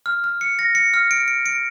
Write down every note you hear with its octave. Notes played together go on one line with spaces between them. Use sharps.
F6
F6
C#7
A#6
C#7
F6
D7
D7
D7